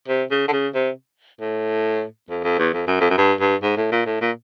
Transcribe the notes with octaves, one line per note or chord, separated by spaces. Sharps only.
C3
C#3
D3
C#3
C3
A2
F2
F2
E2
F2
F#2
F2
F#2
G2
G2
G#2
A2
A#2
A2
A#2